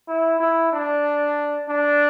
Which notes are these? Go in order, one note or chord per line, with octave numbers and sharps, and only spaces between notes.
E4
E4
D4
D4